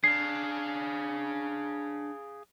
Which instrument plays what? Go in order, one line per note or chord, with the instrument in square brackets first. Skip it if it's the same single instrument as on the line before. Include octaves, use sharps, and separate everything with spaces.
[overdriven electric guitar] D4 [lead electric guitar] G#4 F5 [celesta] C7